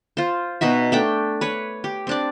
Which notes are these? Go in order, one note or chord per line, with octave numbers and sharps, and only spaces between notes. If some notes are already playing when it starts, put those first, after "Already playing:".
F4 C5
B2 D#4 F#4 E5
A3 D4 G5
B4 C#5
G4
C4 D4 D5